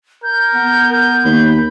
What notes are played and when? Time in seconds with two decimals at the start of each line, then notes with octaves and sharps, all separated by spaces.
0.23 A#4 G6
0.55 B3
0.92 A#4 G6
1.25 D#2 B5